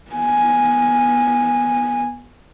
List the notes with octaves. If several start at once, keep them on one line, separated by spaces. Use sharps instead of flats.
B3 G#5